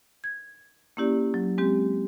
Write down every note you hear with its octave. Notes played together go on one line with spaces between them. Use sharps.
G#6
A#3 C#4 E4 G4 D5
F#3
G#3 C4 G4